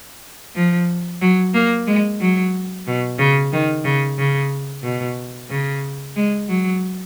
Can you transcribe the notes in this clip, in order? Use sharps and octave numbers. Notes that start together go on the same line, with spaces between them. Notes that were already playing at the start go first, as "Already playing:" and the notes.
F3
F#3
A#3
G#3
F#3
B2
C#3
D#3
C#3
C#3
B2
C#3
G#3
F#3